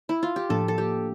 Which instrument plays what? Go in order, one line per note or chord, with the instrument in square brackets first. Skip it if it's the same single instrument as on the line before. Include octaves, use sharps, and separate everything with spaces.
[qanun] E4
F4
G4
[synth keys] A2 F3 A#3 D4 [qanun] A4
[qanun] A4
G4